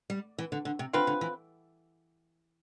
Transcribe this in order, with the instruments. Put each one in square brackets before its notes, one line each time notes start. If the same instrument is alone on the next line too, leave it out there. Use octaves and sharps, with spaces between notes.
[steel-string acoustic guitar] G3
E3
D3
D3
C3
[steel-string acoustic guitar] D3 [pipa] C4 F4 B4
[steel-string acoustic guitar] D3
E3